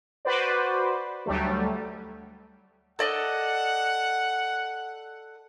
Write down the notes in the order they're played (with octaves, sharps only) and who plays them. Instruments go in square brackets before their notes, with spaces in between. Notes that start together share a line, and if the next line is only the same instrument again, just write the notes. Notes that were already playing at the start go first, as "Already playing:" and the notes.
[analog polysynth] F#4 B4 C5 D5
D2 F#3 G3 A3
[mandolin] A4 D5 D#5 [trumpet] F#5